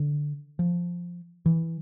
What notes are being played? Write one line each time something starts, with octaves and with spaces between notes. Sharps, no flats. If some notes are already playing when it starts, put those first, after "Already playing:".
Already playing: D3
F3
E3